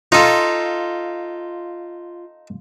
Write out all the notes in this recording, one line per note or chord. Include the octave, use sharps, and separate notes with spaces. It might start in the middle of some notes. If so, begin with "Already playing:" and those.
D#4 F4 A4